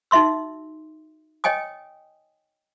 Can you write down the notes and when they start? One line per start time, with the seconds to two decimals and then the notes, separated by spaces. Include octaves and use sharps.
0.11 D#4 F#4 E5 C6 E6
1.44 C#5 D#5 G5 G#5 D#6